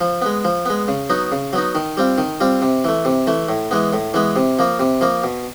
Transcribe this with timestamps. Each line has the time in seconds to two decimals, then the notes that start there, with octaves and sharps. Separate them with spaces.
0.01 F3
0.22 G#3 B3
0.45 F3
0.66 G#3 B3
0.88 C#3
1.10 F#3 B3 D#4
1.32 C#3
1.53 F#3 B3 D#4
1.75 D#3
1.97 G3 C4 F4
2.18 D#3
2.41 G3 C4 F4
2.62 C3
2.84 E3 A3
3.05 C3
3.27 E3 A3
3.49 A2
3.71 E3 G#3 B3
3.93 A2
4.14 E3 G#3 B3
4.36 C3
4.59 F3 A#3
4.80 C3
5.01 F3 A#3
5.23 B2